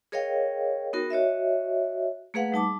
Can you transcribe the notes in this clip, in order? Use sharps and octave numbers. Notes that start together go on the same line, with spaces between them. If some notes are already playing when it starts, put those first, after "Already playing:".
G#4 A#4 C#5 D#5 F5 G5
B3 D#4 F#4 A#4
F#4 C#5 D#5 E5
A3 A#3 G#4 B4 F5 F#5
G3 D#4 A5 D6